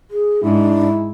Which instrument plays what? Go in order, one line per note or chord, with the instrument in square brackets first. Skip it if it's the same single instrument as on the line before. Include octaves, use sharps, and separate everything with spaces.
[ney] G#4
[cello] G#2 [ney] D4 [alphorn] E4